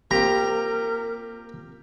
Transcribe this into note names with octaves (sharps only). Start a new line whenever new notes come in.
A#3 C4 F4 G4 A#4 A#5